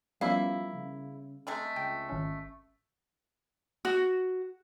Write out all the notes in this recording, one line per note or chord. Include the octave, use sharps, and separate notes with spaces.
F3 G3 A#3 B3 C#4 E4 F5
C#3
C3 G#3 A3
C#2 G5
G#1 C#4
F#4